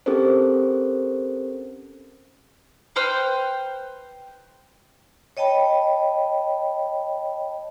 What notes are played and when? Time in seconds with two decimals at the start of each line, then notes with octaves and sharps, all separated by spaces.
0.06 C4 C#4 G4 A4 A#4 C5
2.96 B4 C5 G5 F6
5.37 C#5 D#5 G5 A5 B5